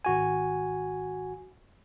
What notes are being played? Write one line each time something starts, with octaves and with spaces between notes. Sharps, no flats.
G#1 F#4 G#5